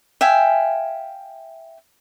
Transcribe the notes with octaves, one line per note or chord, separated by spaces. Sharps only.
E5 F5 G5 G#5